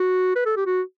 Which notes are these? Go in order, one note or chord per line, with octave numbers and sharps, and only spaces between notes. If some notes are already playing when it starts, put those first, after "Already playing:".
Already playing: F#4
B4
A4
G4
F#4